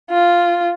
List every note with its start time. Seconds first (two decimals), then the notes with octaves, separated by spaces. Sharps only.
0.11 F4